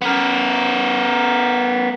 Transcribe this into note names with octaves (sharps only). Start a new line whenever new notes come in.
B3 A#4